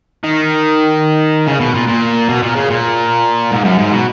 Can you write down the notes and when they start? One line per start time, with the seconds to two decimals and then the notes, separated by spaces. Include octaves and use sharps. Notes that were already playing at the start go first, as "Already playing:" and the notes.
0.24 D#3
1.47 C#3
1.60 B2
1.74 A#2
1.88 A#2
2.29 B2
2.42 A#2
2.56 C#3
2.70 A#2
3.52 G#2
3.65 F#2
3.79 G#2
3.92 B2